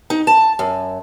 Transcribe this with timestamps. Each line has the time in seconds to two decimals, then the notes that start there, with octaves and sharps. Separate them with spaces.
0.10 D#4
0.27 A5
0.59 F#2